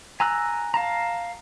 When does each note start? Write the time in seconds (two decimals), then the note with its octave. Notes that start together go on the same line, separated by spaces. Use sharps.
0.20 G#5 A#5 E6 F#6
0.74 F5 A5 A#5